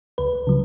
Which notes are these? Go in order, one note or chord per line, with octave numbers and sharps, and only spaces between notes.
C#2 B4
C#3 F#3